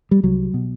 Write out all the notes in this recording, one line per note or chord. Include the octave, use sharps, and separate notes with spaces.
G3
C2 F#3
B2